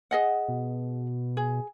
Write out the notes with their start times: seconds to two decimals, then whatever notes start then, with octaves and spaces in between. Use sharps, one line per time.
0.11 G#4 D#5 F#5
0.48 B2
1.37 G#4